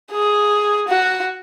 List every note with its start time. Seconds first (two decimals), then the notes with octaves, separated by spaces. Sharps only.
0.11 G#4
0.89 F#4